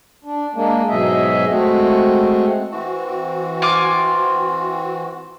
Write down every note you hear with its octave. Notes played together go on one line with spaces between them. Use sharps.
D4
G#3 A#3 D4
G#2 B2 F#3 G#4 D#5 E5
G#3 A3 C4 F#4
E3 C4 F#4
F4 G#5 D6